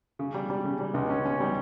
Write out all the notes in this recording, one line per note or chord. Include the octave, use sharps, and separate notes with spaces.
C#3
G3
G3
C#3
G3
C#2
C#4
C#4
G3